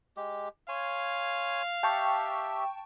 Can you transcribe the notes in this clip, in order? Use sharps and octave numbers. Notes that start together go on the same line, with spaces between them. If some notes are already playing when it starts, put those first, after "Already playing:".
G#3 G4
C#5 F5 G#5 C6
G4 E5 G5 A5 C#6